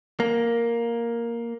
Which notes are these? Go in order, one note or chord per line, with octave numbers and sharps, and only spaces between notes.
A#3